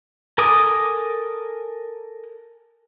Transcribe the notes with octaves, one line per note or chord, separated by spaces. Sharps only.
A4 A#4 G#5 D6 D#6